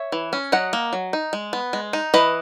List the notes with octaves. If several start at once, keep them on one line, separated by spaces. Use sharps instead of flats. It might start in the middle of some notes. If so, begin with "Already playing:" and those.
Already playing: C#5 E5
E3
C#4
F#3 D#5 F#5
A#3
F#3
D#4
G#3
B3
G#3
D#4
E3 B4 D#5